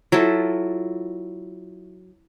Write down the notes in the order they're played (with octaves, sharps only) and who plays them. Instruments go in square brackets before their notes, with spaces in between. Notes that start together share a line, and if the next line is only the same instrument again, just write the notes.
[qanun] F#3 E4 F4 A4